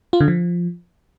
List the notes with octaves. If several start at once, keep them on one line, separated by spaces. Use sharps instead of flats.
F4
D3
F3